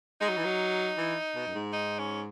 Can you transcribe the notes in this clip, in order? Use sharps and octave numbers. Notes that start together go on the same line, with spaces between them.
G#3 D#4
F#3
E3
F#3
E3
B2
F#2
G#2
D#4
C#4